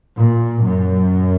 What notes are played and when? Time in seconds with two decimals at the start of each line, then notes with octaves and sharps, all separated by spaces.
0.17 A#2
0.63 F#2